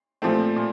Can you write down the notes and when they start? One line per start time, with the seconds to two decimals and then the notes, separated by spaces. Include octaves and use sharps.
0.22 A#2 F3 A3 C4
0.56 A#2